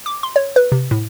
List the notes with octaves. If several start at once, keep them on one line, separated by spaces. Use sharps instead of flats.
D6
C6
C#5
B4
C3
A2